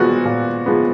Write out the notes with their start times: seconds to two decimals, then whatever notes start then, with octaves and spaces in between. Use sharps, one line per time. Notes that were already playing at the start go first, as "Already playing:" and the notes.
Already playing: A#2 F3 G#3 B3 F#4
0.25 A#2
0.66 F3 G#3 B3